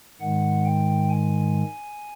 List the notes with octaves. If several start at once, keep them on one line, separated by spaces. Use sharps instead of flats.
G#2 D#3 G#3 F#5
G5
G#5